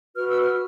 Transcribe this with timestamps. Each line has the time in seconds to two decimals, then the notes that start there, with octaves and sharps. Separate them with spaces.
0.16 F#4 B4 F6
0.29 E6
0.41 F6